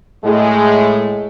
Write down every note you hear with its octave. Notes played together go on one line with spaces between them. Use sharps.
A2 G#3